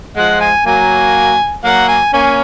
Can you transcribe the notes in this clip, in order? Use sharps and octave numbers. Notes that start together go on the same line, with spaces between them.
F3 G#3 F#5
G#5
F#3 A#3 G#5
F#3 A#3 F#5
G#5
A#3 C#4 G#5